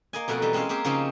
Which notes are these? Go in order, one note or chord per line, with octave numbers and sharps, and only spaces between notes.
A#3 D#5 G#5
F2 B2 A3 A#4 F#5
E3 G3 D#5
G#3 C4 C#4 D#5 F5
A#3 C4 G4 G#4
C#3 F3 A#3 C4 C#4 D#4